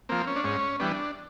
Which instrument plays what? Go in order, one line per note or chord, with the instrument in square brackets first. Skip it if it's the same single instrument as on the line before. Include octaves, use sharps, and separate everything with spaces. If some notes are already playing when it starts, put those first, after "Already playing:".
[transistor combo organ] F3 A#3 C4
C#4
D4
G#2 C#4
E3 G3 B3 D4